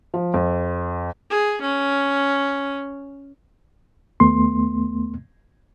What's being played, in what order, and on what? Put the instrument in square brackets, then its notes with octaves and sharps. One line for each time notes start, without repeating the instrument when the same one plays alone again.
[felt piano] F3
F2
[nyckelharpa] G#4
C#4
[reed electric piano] D#2 A3 B3 C6